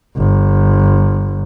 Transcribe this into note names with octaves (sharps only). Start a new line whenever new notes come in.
G1